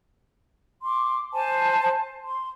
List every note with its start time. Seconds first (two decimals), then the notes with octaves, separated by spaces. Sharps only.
0.83 C6 D6
1.33 C5 G#5 A5
2.22 C6